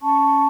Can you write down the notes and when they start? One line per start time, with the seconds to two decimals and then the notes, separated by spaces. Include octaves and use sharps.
0.02 C#4 A5 C#6